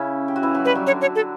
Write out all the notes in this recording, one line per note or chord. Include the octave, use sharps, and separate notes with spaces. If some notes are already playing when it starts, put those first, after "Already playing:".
Already playing: C#3 C#4 E4
G4
F#4
E3 E4
F#3 F#4
G3 G4 B4
F#3 F#4
D3 D4 C#5
C#5
A4